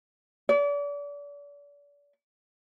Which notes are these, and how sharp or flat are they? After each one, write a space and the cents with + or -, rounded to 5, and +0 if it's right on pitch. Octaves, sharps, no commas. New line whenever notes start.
D5 -35